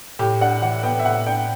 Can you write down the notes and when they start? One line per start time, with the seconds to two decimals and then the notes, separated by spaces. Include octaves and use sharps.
0.19 A2 G4
0.41 D4 F#5
0.62 E3 F#5
0.83 B3 G5
0.99 E5
1.05 A2 F#5
1.26 D4 G5